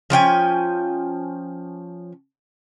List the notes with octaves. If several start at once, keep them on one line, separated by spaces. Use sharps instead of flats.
F3 C#4 G5 G#5